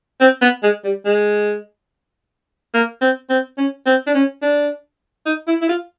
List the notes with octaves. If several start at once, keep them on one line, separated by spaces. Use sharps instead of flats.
C4
B3
G#3
G3
G#3
A#3
C4
C4
C#4
C4
D4
C#4
D4
D#4
E4
E4
F4